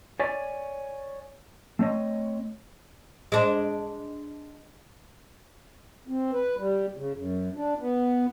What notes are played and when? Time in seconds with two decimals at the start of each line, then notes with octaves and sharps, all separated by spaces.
0.20 C#5 D5 G#5
1.79 A3 C4 C#5 D#5
3.32 G#3 D4
6.08 C4
6.32 B4
6.57 G3
6.97 C#3
7.14 F#2
7.54 D4
7.79 B3